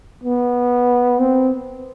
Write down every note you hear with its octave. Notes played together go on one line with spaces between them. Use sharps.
B3
C4